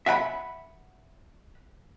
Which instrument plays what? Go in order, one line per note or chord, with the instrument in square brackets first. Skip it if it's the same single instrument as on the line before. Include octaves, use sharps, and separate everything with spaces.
[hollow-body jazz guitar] E5 F#5 G5 B5